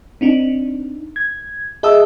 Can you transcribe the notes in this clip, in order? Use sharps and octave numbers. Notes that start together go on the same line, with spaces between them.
C4 D4 D#4
G#6
G#4 D#5 E5 A5 D#6 E6